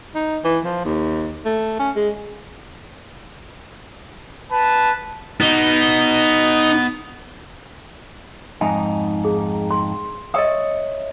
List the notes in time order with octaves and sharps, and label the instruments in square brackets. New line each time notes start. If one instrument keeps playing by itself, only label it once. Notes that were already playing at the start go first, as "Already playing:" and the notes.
[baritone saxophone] D#4
E3
F3
D#2
A3
C#4
G#3
[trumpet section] B4 A5
[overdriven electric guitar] B3 F#4 [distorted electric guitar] D#4
[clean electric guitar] F2 G#2 D#4 [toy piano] G#5
[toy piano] G#4
C6
[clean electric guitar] C#5 E5 [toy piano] D#5 D#6